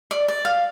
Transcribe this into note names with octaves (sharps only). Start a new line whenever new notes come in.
D5
D5
F5